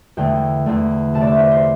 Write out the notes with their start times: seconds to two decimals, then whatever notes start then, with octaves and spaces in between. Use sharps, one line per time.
0.17 E2 D3 A3 G5
0.66 E2 D3 A3
1.14 C3 A3 A5
1.22 D5
1.27 E5
1.39 C5
1.51 C5